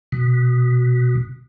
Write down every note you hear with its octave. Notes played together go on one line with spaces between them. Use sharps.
B2